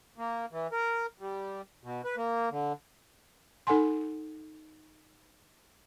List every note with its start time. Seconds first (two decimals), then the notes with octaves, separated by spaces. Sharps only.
0.18 A#3
0.52 E3
0.72 A#4
1.20 G3
1.84 B2
2.04 B4
2.17 A#3
2.51 D3
3.67 D#4 A4 F#5 G#5 C6